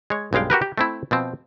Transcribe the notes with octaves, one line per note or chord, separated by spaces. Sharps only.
G#3 C#5
B1 G2 G#3 F5 G5
F#4 G4 A#4 B4
G4
A3 C4 E4
B2 F3 C4